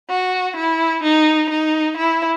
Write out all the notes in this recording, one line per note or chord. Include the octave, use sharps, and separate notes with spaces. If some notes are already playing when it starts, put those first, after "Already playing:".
F#4
E4
D#4
D#4
E4